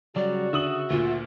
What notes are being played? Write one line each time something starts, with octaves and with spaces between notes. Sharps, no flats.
C#3 F#3 G3 F#4 D5
D3 E5 D#6 F#7
D2 A#2 F4